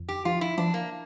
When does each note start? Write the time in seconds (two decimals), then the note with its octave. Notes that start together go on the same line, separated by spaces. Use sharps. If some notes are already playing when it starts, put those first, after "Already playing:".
Already playing: F2
0.09 G4
0.25 F3 F4
0.41 E4
0.58 F3 D4
0.74 A#3